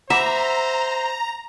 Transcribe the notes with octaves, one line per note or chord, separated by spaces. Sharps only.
C5 E5 F#5 A#5 B5 D6